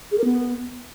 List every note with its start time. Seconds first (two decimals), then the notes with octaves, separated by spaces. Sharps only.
0.12 G#4
0.18 A#4
0.24 B3